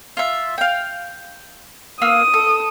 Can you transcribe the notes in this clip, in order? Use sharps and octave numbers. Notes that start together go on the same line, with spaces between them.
F4 E5
F5 G5
A#3 F5 D#6 E6
A4